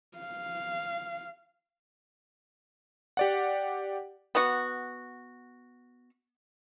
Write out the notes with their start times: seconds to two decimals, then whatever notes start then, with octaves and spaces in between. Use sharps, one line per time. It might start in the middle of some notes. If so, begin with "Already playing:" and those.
0.18 F5
3.17 G4 D5 F#5
4.35 B3 F#4